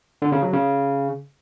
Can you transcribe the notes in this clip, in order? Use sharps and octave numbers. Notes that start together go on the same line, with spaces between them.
D3
C#3
F#3
C#3